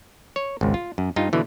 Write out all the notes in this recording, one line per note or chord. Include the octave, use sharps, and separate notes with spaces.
C#5
G#1 C#2
F4
F#2
G2 D#4 F4
B2 D3 E3